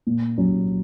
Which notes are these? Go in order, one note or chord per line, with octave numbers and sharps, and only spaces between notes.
A#2
F#3 C#4